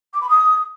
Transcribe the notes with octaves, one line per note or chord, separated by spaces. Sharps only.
D6
B5
D#6